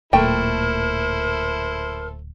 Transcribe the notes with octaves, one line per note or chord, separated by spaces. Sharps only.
D1 A#2 A3 E4 A4 A#4 C5 G5